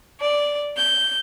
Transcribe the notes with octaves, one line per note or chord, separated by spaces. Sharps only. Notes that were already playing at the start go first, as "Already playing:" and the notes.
D5
G6